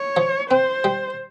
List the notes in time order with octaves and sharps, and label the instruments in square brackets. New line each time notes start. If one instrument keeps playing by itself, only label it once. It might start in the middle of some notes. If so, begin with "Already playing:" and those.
Already playing: [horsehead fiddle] C#5
[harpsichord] F3
[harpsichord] C4 [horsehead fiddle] C5
[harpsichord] G3